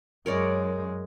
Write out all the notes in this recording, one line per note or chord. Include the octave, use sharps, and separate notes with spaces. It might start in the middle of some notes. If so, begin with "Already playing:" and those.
F#2 G#3 A#4 C#5 D5